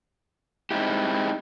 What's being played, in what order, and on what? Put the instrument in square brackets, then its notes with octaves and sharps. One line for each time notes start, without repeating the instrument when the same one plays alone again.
[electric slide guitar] G#3 C4 D#4 E4 G4